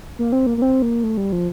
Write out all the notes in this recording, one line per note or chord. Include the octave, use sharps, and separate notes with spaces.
A#3
C4
A#3
A#3
C4
A#3
A3
G3
F3